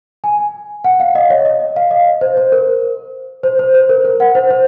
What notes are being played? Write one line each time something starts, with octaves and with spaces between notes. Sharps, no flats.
G#5
F#5
F5
D#5
C#5
D#5
F5
D#5
C5
C5
A#4
C5
C5
C5
A#4
A#4
F#5
C5
C5